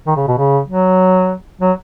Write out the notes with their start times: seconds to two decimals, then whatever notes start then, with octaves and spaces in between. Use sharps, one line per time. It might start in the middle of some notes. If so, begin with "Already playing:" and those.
0.07 D#3
0.17 C#3
0.27 B2
0.38 C#3
0.69 F#3
1.61 F#3